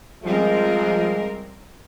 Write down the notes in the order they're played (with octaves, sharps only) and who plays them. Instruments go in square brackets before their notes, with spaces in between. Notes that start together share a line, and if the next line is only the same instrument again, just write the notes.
[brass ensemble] F3 G#3 [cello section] G3 C4 A#4